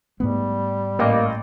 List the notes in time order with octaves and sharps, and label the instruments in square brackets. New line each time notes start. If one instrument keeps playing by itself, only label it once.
[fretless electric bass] G#2 A3 B3 [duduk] G3
[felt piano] A1 D#5 [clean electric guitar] A#3